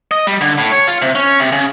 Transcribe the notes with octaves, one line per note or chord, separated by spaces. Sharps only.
D#5
G3
D3
A2
C#5
F4
C3
C#4
C3
C#3